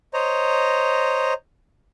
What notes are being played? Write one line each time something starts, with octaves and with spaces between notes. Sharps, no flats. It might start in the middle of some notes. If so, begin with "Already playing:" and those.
C5 C#5 D#5 A#5